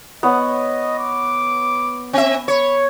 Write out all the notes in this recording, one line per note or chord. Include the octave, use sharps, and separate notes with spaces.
B3 C#5 D#5 F#5
D6
C4 E5
C#5 B5